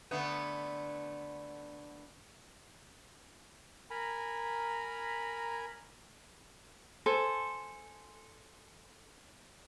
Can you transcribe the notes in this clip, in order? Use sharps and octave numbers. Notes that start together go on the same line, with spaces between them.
D3 A3 B3
A#4 G#5 A#5 B5
A4 C5 G#5